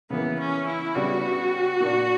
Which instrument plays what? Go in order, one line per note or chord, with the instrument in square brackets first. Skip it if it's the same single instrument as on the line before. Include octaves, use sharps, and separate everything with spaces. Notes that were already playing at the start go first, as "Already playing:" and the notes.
[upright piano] C#3 E3 A#3 [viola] B3
[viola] C#4
E4
[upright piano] C#3 G3 B3 D4 [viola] F#4
[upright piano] A#2 A#3 D4